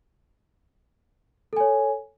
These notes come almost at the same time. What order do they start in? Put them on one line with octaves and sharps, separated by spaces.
A4 G#5 C#5